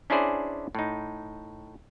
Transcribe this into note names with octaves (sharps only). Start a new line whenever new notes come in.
C#4 D4 E4 G#4 C5 D5
A2 D#4